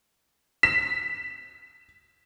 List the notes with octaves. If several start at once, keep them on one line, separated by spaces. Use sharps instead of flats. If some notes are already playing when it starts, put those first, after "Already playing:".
B6 E7